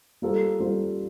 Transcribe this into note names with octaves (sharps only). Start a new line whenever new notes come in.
G3 A#3 F4 A4 C5
G3 A#3 F4 A4 C5